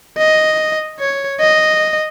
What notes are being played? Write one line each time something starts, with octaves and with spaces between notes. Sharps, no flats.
D#5
C#5
D#5